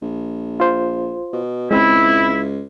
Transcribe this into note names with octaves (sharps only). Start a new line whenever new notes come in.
A#1
F4 C5
B2
C#2 G#3 C4 E4